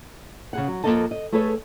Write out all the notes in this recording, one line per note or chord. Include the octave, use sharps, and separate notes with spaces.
C#3 G#4 F#5
F#3
F2 D#3 A#3 A4 D#5 A5
D#5
A3 G#4 A4 B4 C#5